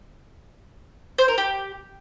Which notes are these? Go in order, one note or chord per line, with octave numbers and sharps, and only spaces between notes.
C5
A#4
G4